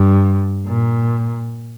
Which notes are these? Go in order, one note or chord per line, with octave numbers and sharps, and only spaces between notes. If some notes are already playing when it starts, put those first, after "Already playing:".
Already playing: G2
A#2